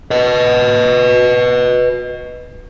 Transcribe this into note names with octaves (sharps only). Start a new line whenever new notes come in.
B4 D#5